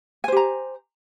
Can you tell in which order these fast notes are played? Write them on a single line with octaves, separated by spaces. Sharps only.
G#5 C5 G4 A#5